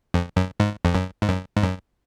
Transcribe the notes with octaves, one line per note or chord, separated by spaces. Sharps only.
F2
F#2
G#2
F2
F#2
G#2
F#2
G#2
F#2